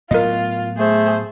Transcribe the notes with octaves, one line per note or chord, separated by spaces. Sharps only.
A2 F#3 B3 F4 A#4 D#5
A3 G#4 C5